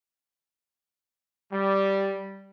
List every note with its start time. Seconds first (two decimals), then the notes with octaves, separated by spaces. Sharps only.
1.52 G3